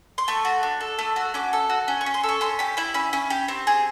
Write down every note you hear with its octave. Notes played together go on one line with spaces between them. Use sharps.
C6
A3 C#6
F#4
D4
A4
A3
F#4
C#4 D6
A4
F#4
C#4
C#6
C#4
C6
A4
C#6
C#4 C6
G4 B5
E4 B5
C#4 B5
C#4
G4
C4
G#4